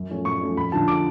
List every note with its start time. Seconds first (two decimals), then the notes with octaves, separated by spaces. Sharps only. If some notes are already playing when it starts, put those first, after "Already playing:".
Already playing: F#2
0.09 F3 A3 C#4
0.25 F#2 C#6
0.41 F3 A3 C#4
0.57 F2 B5
0.72 D3 F3 A5
0.88 D6